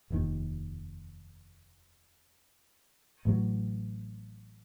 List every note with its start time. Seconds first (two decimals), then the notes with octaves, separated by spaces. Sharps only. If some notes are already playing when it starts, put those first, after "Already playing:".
0.10 F1 D#2 D#3
3.25 A1 A2 F#3